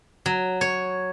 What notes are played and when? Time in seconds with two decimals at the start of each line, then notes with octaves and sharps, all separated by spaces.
0.26 F#3
0.61 C#5